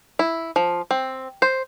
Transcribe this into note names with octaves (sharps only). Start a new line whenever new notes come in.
E4
F3
C4
C5